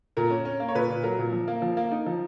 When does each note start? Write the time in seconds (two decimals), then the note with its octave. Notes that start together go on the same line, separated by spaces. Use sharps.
0.17 A#2 A#4
0.31 C#4
0.45 C#4
0.60 A#3
0.69 C#5
0.75 A#2 B4
0.90 A#2
1.03 F#3 A#4
1.19 A#2
1.33 F3
1.48 A#3
1.62 F3
1.77 A#3
1.92 D#4
2.06 F3